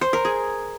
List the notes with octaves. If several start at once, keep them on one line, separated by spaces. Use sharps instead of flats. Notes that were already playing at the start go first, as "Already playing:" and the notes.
C5
A#4
G#4